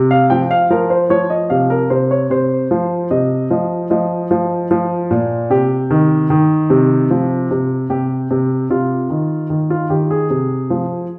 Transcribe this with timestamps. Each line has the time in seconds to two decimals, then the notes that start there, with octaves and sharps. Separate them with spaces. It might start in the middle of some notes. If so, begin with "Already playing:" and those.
Already playing: C3
0.11 F5
0.30 F3 G5
0.51 F5
0.70 F3 A#4
0.90 C5
1.10 F3 C#5
1.30 D#5
1.50 C3 F5
1.70 A#4
1.90 C3 C5
2.11 C#5
2.30 C3 C5
2.71 F3
3.11 C3 D#5
3.50 F3 D#5
3.90 F3 D#5
4.31 F3
4.71 F3
5.11 A#2
5.50 C3 G4
5.90 D#3
6.30 D#3
6.70 C3
7.10 F3
7.51 C3
7.90 C3 G4
8.31 C3
8.70 C3 F4
9.10 D#3
9.50 D#3
9.70 F4
9.90 D#3 G4
10.11 G#4
10.30 C3
10.70 F3